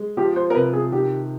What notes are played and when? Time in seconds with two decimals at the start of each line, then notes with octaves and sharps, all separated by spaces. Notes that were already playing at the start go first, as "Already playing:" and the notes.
Already playing: G#3
0.17 F3 G4
0.36 C5
0.50 A#4
0.55 C3 B4
0.73 G#4
0.92 D#3 G4